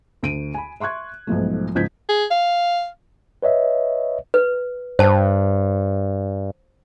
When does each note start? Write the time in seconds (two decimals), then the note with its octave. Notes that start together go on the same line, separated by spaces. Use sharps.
0.23 D2 D7 D#7
0.54 G#5 B5
0.80 E5 C6 C#6 F#6 G#6
1.27 B1 G#2 F3 A3
1.75 C#2 G#2 F3 G6 G#6 B6
2.09 G#4
2.31 F5
3.43 B4 C#5 D#5 E5
4.34 B4
4.99 G2 C5 A5